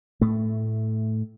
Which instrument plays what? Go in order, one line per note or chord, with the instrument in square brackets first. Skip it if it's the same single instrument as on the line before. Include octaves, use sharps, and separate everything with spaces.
[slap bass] A2 A3